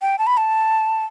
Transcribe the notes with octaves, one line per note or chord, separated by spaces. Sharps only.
G5
A5
B5
A5